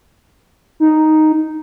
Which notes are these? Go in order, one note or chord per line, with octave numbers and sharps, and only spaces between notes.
D#4